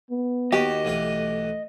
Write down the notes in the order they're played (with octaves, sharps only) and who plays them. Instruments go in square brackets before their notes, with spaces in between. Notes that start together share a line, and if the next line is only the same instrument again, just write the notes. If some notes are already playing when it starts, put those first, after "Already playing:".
[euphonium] B3
[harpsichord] D#2 D#3 F#4 [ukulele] G4 [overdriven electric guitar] D#5
[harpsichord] B1 E3 B4 [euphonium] A3